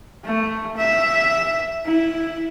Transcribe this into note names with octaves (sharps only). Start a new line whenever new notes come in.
A3
E5
E4